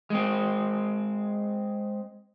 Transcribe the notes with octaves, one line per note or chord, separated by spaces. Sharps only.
G#3 C4